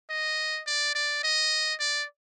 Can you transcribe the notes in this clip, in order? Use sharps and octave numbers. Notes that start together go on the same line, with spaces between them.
D#5
D5
D5
D#5
D5